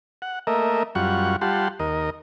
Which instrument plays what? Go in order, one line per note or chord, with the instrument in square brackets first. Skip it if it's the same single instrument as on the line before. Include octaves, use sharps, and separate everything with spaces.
[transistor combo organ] F#5
A3 A#3 A#4 D#5 E5
F#2 G3 F4 F#5 C#6
G3 F4 G4 F#5 A5 C6
D#2 A#4 D#5